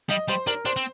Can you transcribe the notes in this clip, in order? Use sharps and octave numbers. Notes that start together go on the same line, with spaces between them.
G3 D#5
G3 C5
D4 A#4
D4 C5
C4